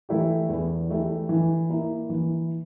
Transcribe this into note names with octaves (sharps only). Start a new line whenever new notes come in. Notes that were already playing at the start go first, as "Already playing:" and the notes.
E3 A3 E4 G4
E2
E3 A3 E4 G4
E3
A#3 E4
E3